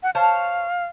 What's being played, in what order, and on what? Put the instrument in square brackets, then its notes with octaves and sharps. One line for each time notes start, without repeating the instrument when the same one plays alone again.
[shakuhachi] F#5
[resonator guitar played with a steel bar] C5 C#5 A5 [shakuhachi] F5